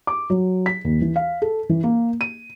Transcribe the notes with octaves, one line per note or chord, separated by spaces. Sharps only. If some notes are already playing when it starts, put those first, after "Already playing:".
D6
F#3
B6
D#2
E3
F5
A4
E3
A#3
D#7